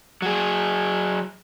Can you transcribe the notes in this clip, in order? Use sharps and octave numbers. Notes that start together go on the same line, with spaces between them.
F#3 G#4